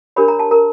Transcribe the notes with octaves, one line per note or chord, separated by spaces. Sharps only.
D4 G4 A#4 C#5 B5
A#5
A5
A#4 A#5